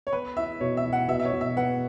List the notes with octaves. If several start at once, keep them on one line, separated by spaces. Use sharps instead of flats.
C#5
B3 B4
E4 E5
B2 C#5
E5
E4
F#5
B2 E5
E5
C#5
B2
E5
B3 F#5